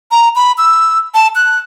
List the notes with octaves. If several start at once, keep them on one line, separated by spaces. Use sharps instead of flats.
A#5
B5
E6
A5
F#6